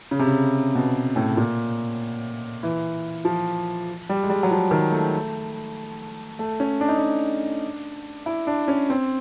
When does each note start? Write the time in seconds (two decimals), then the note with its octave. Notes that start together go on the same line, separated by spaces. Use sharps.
0.11 C#3
0.19 C3
0.27 C#3
0.75 B2
1.16 A2
1.37 A#2
2.63 E3
3.25 F3
4.09 G3
4.23 G#3
4.30 G3
4.43 F#3
4.51 F3
4.71 D#3
4.92 A3
6.39 A3
6.60 C#4
6.81 D4
6.89 D#4
6.98 D4
8.26 E4
8.47 D4
8.68 C#4
8.90 C4